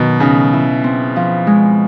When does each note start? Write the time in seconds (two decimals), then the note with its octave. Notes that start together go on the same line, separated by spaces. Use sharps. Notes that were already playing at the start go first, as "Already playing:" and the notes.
Already playing: B2 D#3 F#3
0.20 C#3 D#4
0.53 E4
0.84 C4
1.16 F3
1.47 G#3